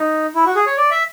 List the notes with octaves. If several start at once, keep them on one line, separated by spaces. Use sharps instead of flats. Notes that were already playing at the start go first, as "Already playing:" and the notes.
Already playing: D#4
E4
F#4
G#4
C#5
D5
E5